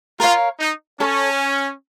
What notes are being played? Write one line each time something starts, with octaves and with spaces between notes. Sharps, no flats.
F4 A#4 C#5 F5
D#4
C#4 A4 C#5 A5 C#6